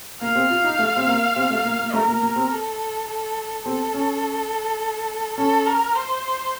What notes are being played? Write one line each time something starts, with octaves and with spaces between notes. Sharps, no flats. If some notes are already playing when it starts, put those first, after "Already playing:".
A#3 F5
C4
F4
D#4
A3
C4
A#3
C4
A3
A#3
A#3
A3 A#4
A#3
A#3
C4
A4
A4
C4 A4
C#4
C#4 A4
A#4
C5